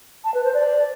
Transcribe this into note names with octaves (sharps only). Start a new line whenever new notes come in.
A5
B4
C5
D5